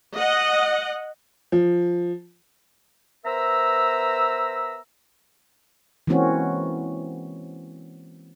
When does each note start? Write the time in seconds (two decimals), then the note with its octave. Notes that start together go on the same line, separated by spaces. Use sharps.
0.15 D#5 F#5
1.52 F3
3.25 B3 A#4 C5 E5 A#5 E6
6.07 E3 G#3 A#3 C4 C#4 F#4